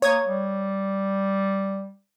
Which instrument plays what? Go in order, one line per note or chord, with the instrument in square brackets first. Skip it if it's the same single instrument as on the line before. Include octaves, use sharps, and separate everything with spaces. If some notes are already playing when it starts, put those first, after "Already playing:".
[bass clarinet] A#3 [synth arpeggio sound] C#5 D#6 G#6
[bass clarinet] G3